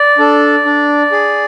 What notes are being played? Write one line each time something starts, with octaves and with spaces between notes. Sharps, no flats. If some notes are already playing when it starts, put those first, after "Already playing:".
Already playing: D5
D4 A4
D4
G#4